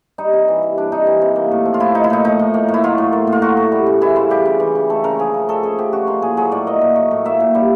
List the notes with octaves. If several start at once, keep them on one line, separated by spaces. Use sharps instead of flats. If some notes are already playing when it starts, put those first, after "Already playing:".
G3 D#4
C3
E3
C3
G3 D4
C3 D#4
E3
C3
A#3
A2
F3
F4
A2 E4
A#3 D#4
E4
A2 D#4
F3 D#4
A2
A#3
A2
E4
F#3 F4
A2
A#3
A2
F4
F#3 F#4
A2
G3
C#3
E3 E4
C#3 F4
G3 G4
C#3
E3
C#3
A3 A4
C#3 A#4
F3 G#4
C#3
A3 A4
C#3 G#4
F3 G4
C#3 F#4
A#3 F4
A2 G#4
F#3 G#4
A2 D5
A#3 D#5
A2
F#3
A2
A#3 E5
A#2
G3